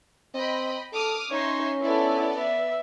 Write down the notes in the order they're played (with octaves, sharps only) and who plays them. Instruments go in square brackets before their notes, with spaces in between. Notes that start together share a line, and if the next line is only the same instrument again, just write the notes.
[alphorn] C4 [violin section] D#5 G5 B5
[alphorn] A4 [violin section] D6 D#6 F6
[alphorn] C#4 [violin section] D#4 E5 C6 [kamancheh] C#5
[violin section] B3 D5 [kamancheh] E4 A4
[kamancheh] E5